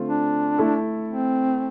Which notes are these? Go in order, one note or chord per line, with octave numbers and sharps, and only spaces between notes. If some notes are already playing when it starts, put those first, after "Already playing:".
Already playing: D3 A3 C4 F4
D4
A3 E4 A4
C4